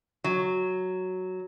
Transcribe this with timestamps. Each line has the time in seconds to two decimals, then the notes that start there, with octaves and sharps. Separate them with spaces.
0.24 F#3